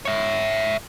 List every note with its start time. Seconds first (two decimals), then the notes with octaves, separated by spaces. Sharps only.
0.05 C#5 E5